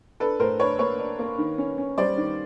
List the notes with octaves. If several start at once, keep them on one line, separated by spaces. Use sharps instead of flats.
D4 A4 B4
A2 A#4 C5
D4 B4 C#5
A#3 B4 C#5
D4
A#3
D#3
C#4
C#4
G3 C5 D5
D#3